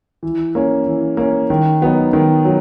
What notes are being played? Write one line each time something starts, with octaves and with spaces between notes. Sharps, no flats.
E3
A#3 C#4
E3
A#3 C#4
D#3
F#3 B3 D#4
D#3
F#3